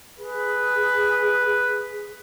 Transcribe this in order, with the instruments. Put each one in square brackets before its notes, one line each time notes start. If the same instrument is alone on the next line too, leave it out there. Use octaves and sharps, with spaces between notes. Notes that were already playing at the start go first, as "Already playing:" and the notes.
[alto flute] G#4 [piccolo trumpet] B4